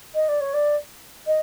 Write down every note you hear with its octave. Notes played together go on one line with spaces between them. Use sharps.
D#5
D5
C#5
D5
D#5